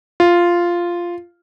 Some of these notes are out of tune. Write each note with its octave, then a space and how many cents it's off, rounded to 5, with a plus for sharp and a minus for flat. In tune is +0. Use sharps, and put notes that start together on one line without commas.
F4 -5